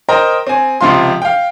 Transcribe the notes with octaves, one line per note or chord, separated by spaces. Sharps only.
A#4 C5 D#5 G5 A#5
C4 G#5
C#2 C3 F3 F5 C6
F5 G5